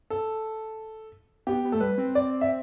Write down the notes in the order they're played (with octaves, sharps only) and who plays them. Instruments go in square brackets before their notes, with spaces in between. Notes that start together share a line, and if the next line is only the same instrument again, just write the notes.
[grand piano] A4
[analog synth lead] B3 [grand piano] G4
[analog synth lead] B3
[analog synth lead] A3 [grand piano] A4
[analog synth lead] G3 [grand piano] B4
[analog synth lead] C4
[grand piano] D5
E5